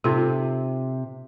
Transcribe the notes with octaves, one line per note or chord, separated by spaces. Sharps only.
C3 D#4 F4 A4